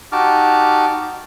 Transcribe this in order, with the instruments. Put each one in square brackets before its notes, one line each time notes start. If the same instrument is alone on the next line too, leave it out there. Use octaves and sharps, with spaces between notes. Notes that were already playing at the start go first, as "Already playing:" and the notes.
[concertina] D#4 F#4 G4 A5 D6 F6